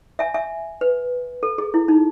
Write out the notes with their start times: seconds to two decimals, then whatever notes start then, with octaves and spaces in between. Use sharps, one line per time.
0.19 E5 G#5
0.34 E5 G#5
0.81 B4
1.43 A4
1.58 G#4
1.74 E4
1.88 D#4